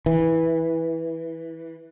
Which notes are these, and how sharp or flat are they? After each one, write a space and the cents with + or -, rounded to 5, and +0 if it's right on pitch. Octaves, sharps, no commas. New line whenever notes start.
E3 -10